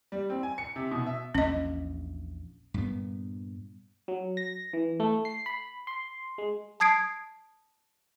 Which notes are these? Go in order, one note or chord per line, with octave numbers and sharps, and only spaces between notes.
G3
C4
G#5
C#7
C3
B2
E5
A#1 E2 C#4 D#5
G2 A#2 B3
F#3
A#6
E3
A3
C7
B5
C6
G#3
A5 D#6 G#6 C7 D7